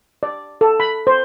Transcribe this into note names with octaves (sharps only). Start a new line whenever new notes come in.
D5
A4
B5
C5